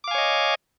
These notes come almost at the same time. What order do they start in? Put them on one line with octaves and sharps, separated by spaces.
D6 F5 G#5 C#5 D#5